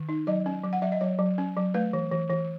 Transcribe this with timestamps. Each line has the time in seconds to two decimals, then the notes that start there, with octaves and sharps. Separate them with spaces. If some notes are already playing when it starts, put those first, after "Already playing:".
Already playing: D#3
0.09 D#4
0.27 F#3 D#5
0.46 C#4
0.64 F#3
0.73 F#5
0.82 F#3 E5
0.92 D#5
1.01 F#3 C#5
1.19 F#3
1.38 C#4
1.57 F#3
1.74 A3 B4
1.93 E3
2.11 E3
2.30 E3